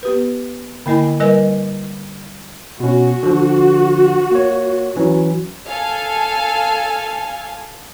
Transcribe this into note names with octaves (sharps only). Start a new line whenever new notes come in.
B3 G4 B4
D3 A#3 E4 D#5 G#5
G3 A#4 B4 D#5 E5 G#5
B2 C#4 F#4
D3 F3
A#3 C#5
E3 F#3 C#4
A4 F5 G#5